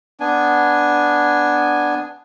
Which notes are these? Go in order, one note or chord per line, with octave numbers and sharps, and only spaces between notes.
B3 D4 G#5